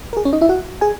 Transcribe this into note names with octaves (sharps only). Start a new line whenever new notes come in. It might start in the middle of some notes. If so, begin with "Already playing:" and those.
A#4
G#4
C#4 C#5
D#4 D#5
E4 E5
F#4 F#5
G#4 G#5